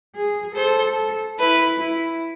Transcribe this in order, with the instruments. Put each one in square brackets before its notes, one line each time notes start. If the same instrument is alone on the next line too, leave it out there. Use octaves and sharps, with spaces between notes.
[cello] G#4
[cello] A4 [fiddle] C5
[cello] E4 [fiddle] B4
[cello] E4